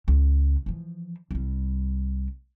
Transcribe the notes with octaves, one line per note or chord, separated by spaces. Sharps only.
C#2
E3 F3
C2 G3